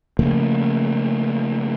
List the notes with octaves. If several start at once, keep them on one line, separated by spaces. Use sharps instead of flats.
C#3 F3 A3 A#3